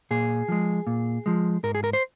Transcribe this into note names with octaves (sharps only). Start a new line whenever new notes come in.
A#2 G#4
F3 G#3
A#2
F3 G#3
G#2 A#4
G#4
A#4
C5